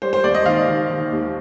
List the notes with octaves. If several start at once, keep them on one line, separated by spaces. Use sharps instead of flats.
G3 C5
C5
D#2 D5
D#5
D#3 F5
D#3
D#3
D#2